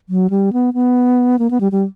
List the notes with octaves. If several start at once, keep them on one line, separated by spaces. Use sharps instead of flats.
F#3
G3
B3
B3
A#3
B3
G3
G3